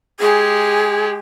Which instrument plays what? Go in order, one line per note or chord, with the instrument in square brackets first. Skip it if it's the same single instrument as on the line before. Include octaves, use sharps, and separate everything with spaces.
[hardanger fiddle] G#3 G4 [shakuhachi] G#4